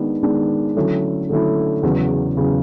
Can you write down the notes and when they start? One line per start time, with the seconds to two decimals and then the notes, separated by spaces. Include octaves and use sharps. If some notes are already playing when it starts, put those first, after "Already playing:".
Already playing: D#3 G#3 B3 D4
0.23 D#3 G#3 B3 D4
0.76 D3 F#3 A3 C#4 E4
1.29 D3 F#3 A3 C#4 E4
1.83 E2 C#3 F#3
2.37 E2 C#3 F#3